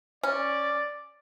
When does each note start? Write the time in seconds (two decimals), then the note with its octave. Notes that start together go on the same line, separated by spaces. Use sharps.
0.23 C#4 D5